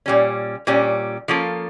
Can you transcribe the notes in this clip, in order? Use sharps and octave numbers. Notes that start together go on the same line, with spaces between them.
A#2 G3 C#4
A#2 G3 C#4
F3 A#3 C#4 F4 A4